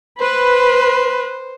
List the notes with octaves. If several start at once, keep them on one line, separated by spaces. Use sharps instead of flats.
B4 C5